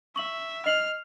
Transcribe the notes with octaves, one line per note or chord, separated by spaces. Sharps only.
E5 C#6 F#7
D#5 F6 C7 F#7